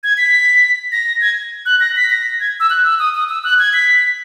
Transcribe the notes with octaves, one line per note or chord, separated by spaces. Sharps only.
G#6
B6
A#6
G#6
F#6
A#6
B6
A#6
G#6
E6
F#6
E6
D#6
D#6
E6
F#6
G#6
B6